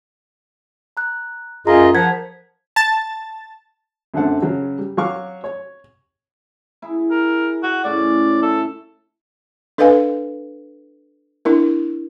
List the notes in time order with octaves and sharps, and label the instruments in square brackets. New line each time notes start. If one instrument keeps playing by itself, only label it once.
[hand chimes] A#5 F#6
[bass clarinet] F#2 [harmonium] F4 G#4 D#5 [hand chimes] A#5
[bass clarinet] F3 [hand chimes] A#4 G#6 B6 [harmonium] F#5
[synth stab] A5 A6
[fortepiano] F#2 D3 A3 C4 F#5 A5
C#3 F#3
G3
F#3 F5 C#6 D6
C#5
[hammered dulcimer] E4 G#4
[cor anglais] A#4
F#4
[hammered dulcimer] A2 C#3 C#4 [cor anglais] D5
[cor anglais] A4 [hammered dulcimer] E5
[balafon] D4 A4 B4 D#5 F5 G#5
D4 E4 A#4